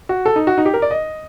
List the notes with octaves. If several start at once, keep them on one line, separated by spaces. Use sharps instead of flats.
F#4
A4
D#4
F#4
D#4
G4
A#4
D5
D#5